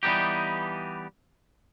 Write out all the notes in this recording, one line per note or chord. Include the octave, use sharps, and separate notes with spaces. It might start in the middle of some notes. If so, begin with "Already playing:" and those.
E3 G3 B3 D#4 G4